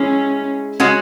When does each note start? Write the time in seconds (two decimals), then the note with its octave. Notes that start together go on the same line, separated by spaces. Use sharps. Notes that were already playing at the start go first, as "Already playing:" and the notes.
Already playing: G#3 C#4 E4 G#4
0.80 G#3 C#4 F#4